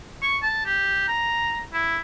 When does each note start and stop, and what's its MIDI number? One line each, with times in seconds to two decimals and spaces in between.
0.22 0.37 85
0.42 0.65 81
0.66 1.06 67
1.08 1.61 82
1.73 1.99 64